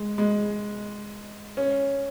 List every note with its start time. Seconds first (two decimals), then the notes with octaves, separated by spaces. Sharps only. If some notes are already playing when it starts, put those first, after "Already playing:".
Already playing: G#3
0.18 G#3
1.57 C#4